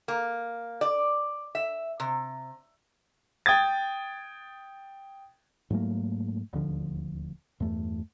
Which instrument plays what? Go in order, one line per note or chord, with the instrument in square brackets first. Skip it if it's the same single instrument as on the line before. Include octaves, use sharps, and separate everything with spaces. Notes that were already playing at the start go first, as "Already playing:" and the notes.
[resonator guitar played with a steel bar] A#3
D5
E5
C3
[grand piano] G5 D#6 G#6 A6
[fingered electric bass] G#2 F#3 A3 A#3
D#1 D2 D3 F3
E2 G2 A3